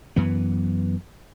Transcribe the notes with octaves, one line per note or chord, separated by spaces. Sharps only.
F#2 E3 B3